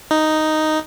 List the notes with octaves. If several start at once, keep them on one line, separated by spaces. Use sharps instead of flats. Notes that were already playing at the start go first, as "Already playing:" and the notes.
D#4